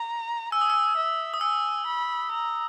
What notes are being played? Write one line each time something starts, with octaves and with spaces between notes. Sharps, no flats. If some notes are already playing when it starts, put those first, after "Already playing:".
Already playing: A#5
G#5 E6
D#6
E6
E5
D#6
G#5 E6
B5
A#5